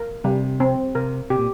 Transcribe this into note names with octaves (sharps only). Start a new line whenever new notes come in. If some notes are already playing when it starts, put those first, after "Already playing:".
Already playing: A#4
C3 G3
C4
C3 A#4
C3 G4
A#2